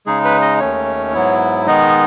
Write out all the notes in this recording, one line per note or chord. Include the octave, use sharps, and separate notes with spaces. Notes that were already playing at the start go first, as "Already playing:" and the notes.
C#3 G#3 D#4 G#4
B4
D#5
D#2 D#3 A3 C#4 C#5
G#2 F#3 B3 E4
D#3 G#3 B3 D#4 D#5